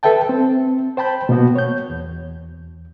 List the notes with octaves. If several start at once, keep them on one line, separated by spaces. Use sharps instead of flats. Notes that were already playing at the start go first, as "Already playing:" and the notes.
A4 B4 E5 G5 A5
C4
C5 G5 A5 B5 G6
B2 A#3 B3 F#4
C#5 G6
E2